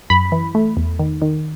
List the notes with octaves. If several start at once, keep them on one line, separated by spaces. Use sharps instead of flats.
F#2 B5
E3
A3
E2
D#3
D#3